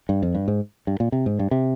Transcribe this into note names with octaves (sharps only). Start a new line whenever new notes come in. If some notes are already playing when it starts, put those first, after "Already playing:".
G2
F2
G2
G#2
G2
A#2
C3
G#2
G2
C3